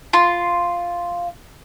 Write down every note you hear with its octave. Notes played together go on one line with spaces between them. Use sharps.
F4 C6